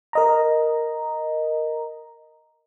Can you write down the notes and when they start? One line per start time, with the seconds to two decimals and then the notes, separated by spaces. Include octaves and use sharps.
0.13 A#4 D#5 A#5